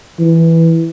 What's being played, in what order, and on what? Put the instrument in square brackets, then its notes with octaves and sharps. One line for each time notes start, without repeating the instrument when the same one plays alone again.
[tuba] E3